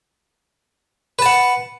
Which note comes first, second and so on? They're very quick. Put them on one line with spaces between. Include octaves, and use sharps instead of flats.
B4 A5 F#5